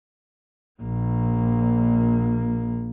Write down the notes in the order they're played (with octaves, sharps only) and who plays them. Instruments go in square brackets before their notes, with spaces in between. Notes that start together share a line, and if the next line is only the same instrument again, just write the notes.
[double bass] A#1 A#3